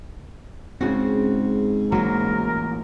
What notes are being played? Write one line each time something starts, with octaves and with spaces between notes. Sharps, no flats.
G#2 C#3 C4 F#4
A1 F#3 A#3 A#4